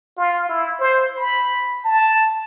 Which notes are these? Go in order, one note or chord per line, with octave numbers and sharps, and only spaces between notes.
F4
E4
C5
B5
A5